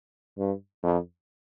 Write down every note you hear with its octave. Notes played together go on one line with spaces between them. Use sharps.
G2
F2